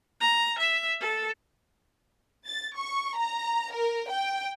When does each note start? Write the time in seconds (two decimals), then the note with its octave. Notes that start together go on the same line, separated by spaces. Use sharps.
0.21 A#5
0.58 E5
1.01 A4
2.46 A6
2.75 C#6
3.16 A#5
3.72 A#4
4.09 G5